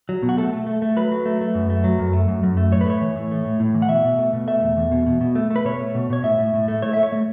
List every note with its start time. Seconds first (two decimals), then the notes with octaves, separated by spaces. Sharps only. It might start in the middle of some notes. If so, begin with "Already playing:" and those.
0.09 F#3
0.23 B2
0.29 F#4
0.37 A3 A4
0.53 A3
0.67 A3
0.82 A3
0.97 F#3 B4
1.12 F#3
1.26 A3
1.41 A3
1.55 F#2
1.70 A3
1.84 F#3
1.99 F#2
2.13 A3
2.28 F#2
2.43 F#2
2.57 A3
2.72 A2 C#5
2.81 B4
2.86 A3 C#5
3.01 E3
3.16 A2
3.31 A3
3.45 A2
3.60 A2
3.75 E3
3.82 F#5
3.89 B2 E5
4.04 B2
4.19 A3
4.33 B2
4.48 A3 E5
4.63 E2
4.77 E2
4.92 B2
5.07 B2
5.21 B2
5.35 A3
5.50 A3
5.56 B4
5.65 B2 C#5
5.80 A3
5.95 B2
6.10 B2 C#5
6.24 A2 E5
6.39 A2
6.54 A2
6.68 A3
6.82 A3 C#5
6.93 A3 E5
7.03 C#5
7.12 A3